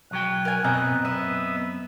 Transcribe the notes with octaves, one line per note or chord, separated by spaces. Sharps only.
B1 F#3 G5 F#6
A#4 G#5
F#2 B2 C4 D#5 A#5
B3 D#5 E5